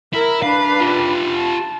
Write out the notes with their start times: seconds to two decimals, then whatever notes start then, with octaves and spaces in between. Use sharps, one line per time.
0.13 E4 A#4
0.42 D4 B4 F5
0.80 F4 G4
1.37 A5